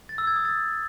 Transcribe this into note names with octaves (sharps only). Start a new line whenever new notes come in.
A6
E6
G#6
D#6
A6